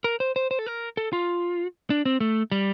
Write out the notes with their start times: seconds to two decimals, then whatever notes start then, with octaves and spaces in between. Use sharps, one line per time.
0.04 A#4
0.20 C5
0.36 C5
0.51 C5
0.59 A4
0.67 A#4
0.97 A4
1.13 F4
1.90 D4
2.05 C4
2.20 A3
2.52 G3